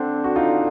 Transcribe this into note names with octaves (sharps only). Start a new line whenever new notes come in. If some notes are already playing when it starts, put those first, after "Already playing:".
Already playing: D3 C4 D4
F#4
D#4 F4